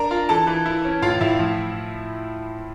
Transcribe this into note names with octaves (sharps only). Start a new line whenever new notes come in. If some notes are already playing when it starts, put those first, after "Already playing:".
Already playing: D4 A#4 A#5
F4
E3 A4 A5
E3
E4
C#4
A2 F4 F5
A2 E4 E5
F3